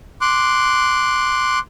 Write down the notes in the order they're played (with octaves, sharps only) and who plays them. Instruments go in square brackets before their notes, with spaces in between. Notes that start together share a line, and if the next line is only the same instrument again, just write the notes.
[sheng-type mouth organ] C6 D6 F#6